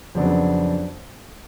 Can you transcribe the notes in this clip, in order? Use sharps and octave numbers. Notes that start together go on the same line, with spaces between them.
F2 C#3 F#3 B3 D4